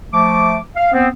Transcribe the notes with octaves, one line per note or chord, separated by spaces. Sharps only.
F3 A3 D6
F5
B3 C4